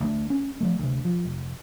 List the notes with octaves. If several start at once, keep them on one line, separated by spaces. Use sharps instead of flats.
D2 G3 A3
C#4
F3 G3 A3
D2 C3
F3
F1